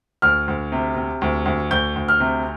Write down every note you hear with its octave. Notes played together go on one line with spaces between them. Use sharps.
D2 F6
D2
C3
C3
D2
D2
D2 G6
D2
F6
C3